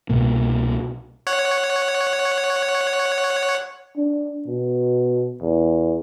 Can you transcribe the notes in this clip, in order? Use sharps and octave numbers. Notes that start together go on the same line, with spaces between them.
C2 B2 A#3
C#5 F#5
D4
B2
E2